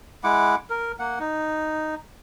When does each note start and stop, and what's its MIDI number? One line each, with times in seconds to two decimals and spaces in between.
0.24 0.56 56
0.24 0.56 64
0.24 0.56 78
0.24 0.56 86
0.70 0.92 70
0.99 1.19 58
0.99 1.19 78
1.20 1.95 63